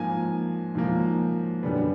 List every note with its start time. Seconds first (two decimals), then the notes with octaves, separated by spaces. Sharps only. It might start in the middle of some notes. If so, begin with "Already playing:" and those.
Already playing: G#2 F3 A#3 G#5
0.75 G#2 F3 A#3
1.63 F#2 D3 G3 B3